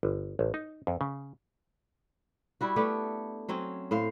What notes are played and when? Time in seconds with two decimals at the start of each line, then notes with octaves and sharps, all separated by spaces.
0.03 G1
0.39 A1
0.54 D#4
0.87 F2
1.01 C#3
2.61 G3 E4 F#4
2.76 A3 B3 D4 G4
3.49 F#3 C4 C#4
3.91 A2 C5 F5